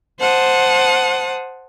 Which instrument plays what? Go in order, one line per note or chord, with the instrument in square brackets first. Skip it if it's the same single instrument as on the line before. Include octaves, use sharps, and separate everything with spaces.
[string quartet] C5 F#5 A5 D#6